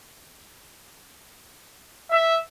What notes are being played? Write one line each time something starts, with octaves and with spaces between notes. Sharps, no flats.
E5